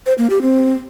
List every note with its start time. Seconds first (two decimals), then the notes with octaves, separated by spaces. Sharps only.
0.06 C5
0.18 A#3
0.30 G4
0.42 C4